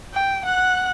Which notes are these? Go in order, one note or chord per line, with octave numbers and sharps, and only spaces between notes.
G5
F#5 F#6